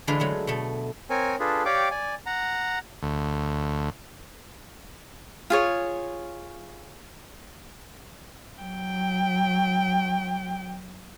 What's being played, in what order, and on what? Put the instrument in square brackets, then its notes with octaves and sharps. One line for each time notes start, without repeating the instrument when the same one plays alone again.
[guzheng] D3 E3 G#3 D4 F4 B4
F#3 G#3 A3
B2 A3
[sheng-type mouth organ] C4 A#4 C#5 G#5
D4 F4 G#4 A4 B4
G4 C#5 D5 F5 G5 D6
D5 G#5
F#5 A#5
[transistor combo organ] D2
[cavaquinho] F4 G#4 C#5
[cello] F#3 G5